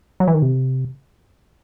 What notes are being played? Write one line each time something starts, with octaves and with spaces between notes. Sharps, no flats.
F#3
E3
D#3
C3